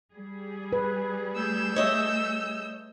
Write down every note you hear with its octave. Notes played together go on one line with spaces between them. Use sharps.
G3 G#4
B4
A3 E6 G6
C#5 D#5 E5